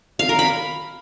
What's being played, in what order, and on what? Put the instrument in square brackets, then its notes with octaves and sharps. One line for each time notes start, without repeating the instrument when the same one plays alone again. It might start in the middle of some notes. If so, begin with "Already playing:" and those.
[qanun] F5
A#4
B5